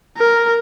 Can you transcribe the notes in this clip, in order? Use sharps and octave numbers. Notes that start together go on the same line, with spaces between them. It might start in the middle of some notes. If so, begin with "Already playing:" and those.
A#4